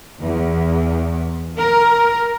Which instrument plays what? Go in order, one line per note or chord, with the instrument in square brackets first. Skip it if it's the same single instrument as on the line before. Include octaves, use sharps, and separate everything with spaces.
[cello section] E2
A#4